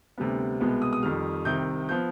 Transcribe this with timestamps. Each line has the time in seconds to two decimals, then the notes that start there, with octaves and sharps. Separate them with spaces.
0.18 D2 C3 G3 B3
0.61 C2 B2 G#3 B3
0.82 D#6
0.93 D#6
1.03 F2 D#3 G3 F6
1.45 C2 C3 D#3 G6
1.89 F3 B3 G6